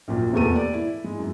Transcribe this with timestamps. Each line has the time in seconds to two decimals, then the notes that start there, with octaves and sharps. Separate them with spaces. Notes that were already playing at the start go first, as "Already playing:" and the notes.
0.08 A#1 F#2 A#2
0.33 F1 E2 A#2 G4 A4 D#7
0.56 D5
0.74 E4
1.04 G#3
1.19 F#2